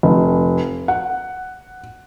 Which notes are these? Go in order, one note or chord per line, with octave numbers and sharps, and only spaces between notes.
F1
F#5